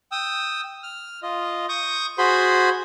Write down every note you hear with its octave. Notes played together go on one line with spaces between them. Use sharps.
G5 D#6 E6
F6
F4 D#5
C#6 D#6 G6
F#4 G#4 C5 B5 C6